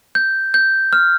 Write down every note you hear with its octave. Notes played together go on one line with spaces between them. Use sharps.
G6
G6
F6